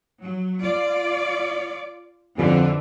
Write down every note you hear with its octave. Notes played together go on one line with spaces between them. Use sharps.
F#3
F4 D5
F2 D3 E3